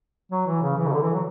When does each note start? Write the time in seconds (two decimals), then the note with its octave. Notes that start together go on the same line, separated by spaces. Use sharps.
0.32 F#3
0.47 E3
0.63 C#3
0.78 E3
0.87 C#3
0.93 D3
1.02 E3
1.13 F#3